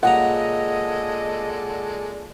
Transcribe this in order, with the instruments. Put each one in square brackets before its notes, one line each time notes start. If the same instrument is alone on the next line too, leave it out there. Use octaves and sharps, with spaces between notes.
[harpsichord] A#2 C#3 A#5 [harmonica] G#3 A4 D5 [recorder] D#5 [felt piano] F#5